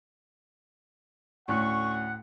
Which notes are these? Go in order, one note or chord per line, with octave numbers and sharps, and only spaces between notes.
D2 A2 C#4 F#5 C#6 F#6